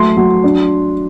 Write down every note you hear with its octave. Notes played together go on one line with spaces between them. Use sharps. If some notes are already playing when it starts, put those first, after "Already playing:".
Already playing: F#3 A3 C6
F#3
D4